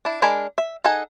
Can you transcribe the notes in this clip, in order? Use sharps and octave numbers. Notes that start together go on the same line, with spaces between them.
D4 E4
G#3 D4 A#4 G#5 B5
E5
D#4 G#4 A4 F#5 G#5